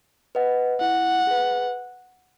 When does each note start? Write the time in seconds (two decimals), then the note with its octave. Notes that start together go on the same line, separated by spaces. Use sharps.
0.35 B4 D#5 F#5
0.81 E4 F#5
1.27 G#4 B4